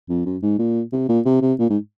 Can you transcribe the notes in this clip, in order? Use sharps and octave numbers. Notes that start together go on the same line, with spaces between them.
F2
F#2
G#2
A#2
C3
A#2
C3
C3
A#2
G#2